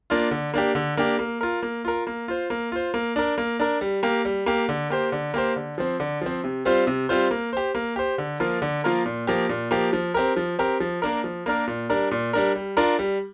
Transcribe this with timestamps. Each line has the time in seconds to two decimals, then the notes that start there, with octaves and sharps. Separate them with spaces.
0.10 A#3 D4 F4
0.31 D3
0.54 A#3 D4 G4
0.75 D3
0.97 A#3 D4 G4
1.19 A#3
1.41 F4 A#4
1.63 A#3
1.85 F4 A#4
2.07 A#3
2.28 F4 C5
2.50 A#3
2.72 F4 C5
2.94 A#3
3.16 D4 A#4
3.38 A#3
3.60 D4 A#4
3.81 G3
4.03 A#3 G4
4.25 G3
4.46 A#3 G4
4.69 D3
4.90 A#3 G4 C5
5.12 D3
5.34 A#3 G4 C5
5.56 D3
5.78 F3 C4
6.00 D3
6.22 F3 C4
6.44 C3
6.65 G3 C4 F4 C5
6.87 C3
7.09 G3 C4 F4 C5
7.31 A#3
7.53 G4 C5
7.75 A#3
7.96 G4 C5
8.18 D3
8.40 F3 A#3 F4 A#4
8.62 D3
8.84 F3 A#3 F4 A#4
9.06 A#2
9.27 F3 A#3 G4
9.49 A#2
9.71 F3 A#3 G4
9.93 F3
10.14 C4 G4 A#4
10.36 F3
10.59 C4 G4 A#4
10.80 F3
11.02 A#3 D4 A#4
11.24 F3
11.46 A#3 D4 A#4
11.67 A#2
11.90 G3 D4 A#4
12.11 A#2
12.33 G3 D4 A#4
12.56 G3
12.77 D4 F4 A#4
12.99 G3